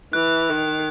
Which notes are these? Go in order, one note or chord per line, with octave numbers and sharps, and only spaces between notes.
E3 F#6
D#3